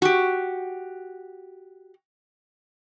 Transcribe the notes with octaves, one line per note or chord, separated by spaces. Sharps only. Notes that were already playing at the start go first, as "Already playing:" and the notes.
F#4 G4